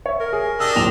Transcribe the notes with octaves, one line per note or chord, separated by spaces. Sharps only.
C#5 E5
A#4
G#4
D4 G4 D#5 E6
D1 A#2 F7